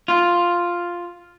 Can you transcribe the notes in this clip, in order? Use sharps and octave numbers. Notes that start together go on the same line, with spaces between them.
F4